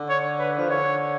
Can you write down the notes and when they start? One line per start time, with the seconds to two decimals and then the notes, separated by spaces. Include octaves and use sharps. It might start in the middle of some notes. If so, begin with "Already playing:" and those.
Already playing: D3
0.09 C#5
0.39 B4
0.58 F3
0.69 D3 C#5